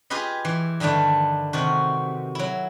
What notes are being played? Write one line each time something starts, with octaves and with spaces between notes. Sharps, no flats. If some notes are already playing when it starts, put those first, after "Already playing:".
F4 G4 G#4 B4 D#5
E3
G2 D3 D#3 A3 D4
C3 D#3 F#4
F#3 E4